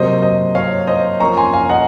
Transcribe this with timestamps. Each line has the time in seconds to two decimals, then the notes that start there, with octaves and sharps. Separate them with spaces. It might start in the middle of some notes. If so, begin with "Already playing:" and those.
Already playing: C3 F#3 A#3 C5 D#5
0.22 C5 D#5
0.55 C#5 F5
0.87 C5 D#5
1.20 F3 A#3 C#4 A#5 C#6
1.37 G#5 C6
1.53 F5 G#5
1.69 D#5 F#5